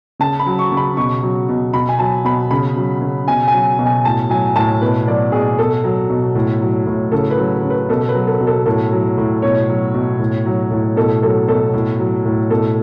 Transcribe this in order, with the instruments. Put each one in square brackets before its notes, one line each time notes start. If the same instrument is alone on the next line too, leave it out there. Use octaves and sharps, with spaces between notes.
[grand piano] C#3 A5
B5
F#3
C#6
C#3
B5
B2 C#6
F#3
B2
B2 B5
G#5
F#3 A5
B2 B5
C#3 B5
F#3
C#3
B2 G#5
G#5
F#3
B2
G#5
A2 A5
F#3 G#5
A2 A5
B2 B4
F#3 D5
B2 G#4
B2 A4
F#3
B2
A2
F#3
A2
C#3 A4
B4
F#3
C#3
B4
B2 A4
B4
F#3
A4
B2
A4
A2 A4
F#3
A2
B2 C#5
F#3
B2
A2
F#3
A2
B2 A4
F#3 A4
B2 A4
A2
F#3
A2
B2 A4